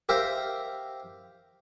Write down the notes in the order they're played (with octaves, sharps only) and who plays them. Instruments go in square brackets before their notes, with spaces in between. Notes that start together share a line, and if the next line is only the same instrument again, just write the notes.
[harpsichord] G4 A#4 C5 E5 F5 G5